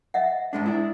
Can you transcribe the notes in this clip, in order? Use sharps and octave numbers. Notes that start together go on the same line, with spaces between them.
D#5 E5 F#5
G#2 G#3 D4
E4 D5